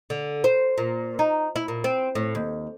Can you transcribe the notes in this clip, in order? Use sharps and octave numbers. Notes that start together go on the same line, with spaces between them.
D3
C5
A#2
D#4
E4
A#2
C4
A2
D#2